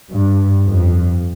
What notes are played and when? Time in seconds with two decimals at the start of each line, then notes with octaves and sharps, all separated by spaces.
0.12 G2
0.67 F2